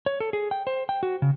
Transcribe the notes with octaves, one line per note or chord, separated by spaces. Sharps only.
C#5
A4
G#4
G5
C5
G5
F#4
C#3